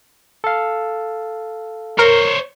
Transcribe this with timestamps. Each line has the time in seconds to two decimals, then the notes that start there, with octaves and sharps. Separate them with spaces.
0.44 A4 F5
1.99 A#4 C5 C#5